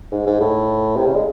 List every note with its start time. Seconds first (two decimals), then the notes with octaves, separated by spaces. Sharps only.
0.12 G#2
0.27 G#2
0.41 A2
0.97 C3
1.06 C#3
1.16 G#3